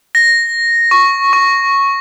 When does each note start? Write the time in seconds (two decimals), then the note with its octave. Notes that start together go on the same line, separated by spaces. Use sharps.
0.15 A#6
0.91 C#6
1.33 C#6